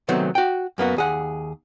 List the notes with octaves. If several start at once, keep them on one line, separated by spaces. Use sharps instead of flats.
C3 D#3 F#3 A3 B3 C4
F#4 G5
F#2 A#3 B3 F#4
D#2 G#4 F#5